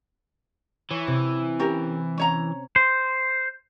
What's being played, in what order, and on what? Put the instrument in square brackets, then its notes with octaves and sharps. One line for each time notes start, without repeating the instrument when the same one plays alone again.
[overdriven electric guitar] E3 [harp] C#5
[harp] C3
[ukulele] C#4 G4 A#4
C#4 C#5 A#5
[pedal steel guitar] C5